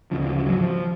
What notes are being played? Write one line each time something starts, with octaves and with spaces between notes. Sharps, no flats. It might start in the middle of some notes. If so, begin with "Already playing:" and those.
D2 C#3 F3
G#1 F#3
F3